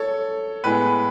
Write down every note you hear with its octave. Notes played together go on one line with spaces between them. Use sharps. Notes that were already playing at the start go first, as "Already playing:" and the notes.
Already playing: A4 C#5
A2 G#3 B3 B4